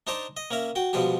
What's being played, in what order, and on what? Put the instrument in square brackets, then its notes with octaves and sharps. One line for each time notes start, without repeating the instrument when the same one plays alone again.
[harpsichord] D4 D#4 C5 C#5 A5 D6
D#5
A#3 C#4 A#4 E5
F#4 G5
B2 F3 G3 G#3 D4 G4